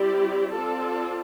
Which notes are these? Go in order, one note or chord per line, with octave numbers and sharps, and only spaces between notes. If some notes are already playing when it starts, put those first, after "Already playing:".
Already playing: G3 C4 E4 G4 D5
C4 F4 A4 D5